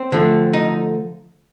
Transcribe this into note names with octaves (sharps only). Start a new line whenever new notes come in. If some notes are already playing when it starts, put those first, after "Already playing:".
Already playing: C4
D3 F3 A3
D#4